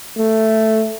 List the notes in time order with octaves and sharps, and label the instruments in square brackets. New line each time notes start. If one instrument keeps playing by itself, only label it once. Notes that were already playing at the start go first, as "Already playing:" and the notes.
[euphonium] A3